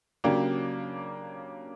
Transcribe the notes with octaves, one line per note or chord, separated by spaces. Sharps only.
C#3 F#3 A#3 D4 G4